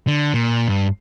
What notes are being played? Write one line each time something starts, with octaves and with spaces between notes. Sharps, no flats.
D3
A#2
G2